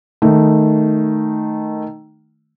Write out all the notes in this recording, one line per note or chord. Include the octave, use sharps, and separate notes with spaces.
D#3 A3